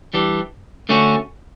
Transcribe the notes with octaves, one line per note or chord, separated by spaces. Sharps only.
E3 G3 D4 G4
D3 A3 C#4 F#4